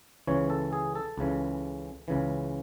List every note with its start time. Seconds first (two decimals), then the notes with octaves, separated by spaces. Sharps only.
0.27 C#2 C#3 E3 C#5
0.50 A4
0.73 G#4
0.95 A4
1.18 C#2 C#3 E3
2.08 C#2 C#3 E3